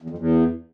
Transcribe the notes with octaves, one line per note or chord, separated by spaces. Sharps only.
E2
F2
E2